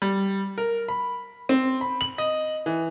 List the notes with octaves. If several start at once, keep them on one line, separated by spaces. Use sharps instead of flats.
G3
A#4
B5
C4
B5
F#7
D#5
E3